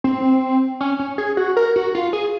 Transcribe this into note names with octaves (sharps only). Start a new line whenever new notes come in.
C4
C#4
C#4
G#4
F#4
A#4
F#4
F4
G#4